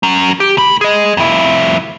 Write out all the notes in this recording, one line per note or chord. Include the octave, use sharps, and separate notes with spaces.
F#3 C#4
G4
A2 B5
G#4 D#5
F2 E4